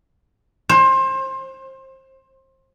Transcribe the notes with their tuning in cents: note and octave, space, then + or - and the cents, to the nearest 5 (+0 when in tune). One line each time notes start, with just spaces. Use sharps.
C5 +25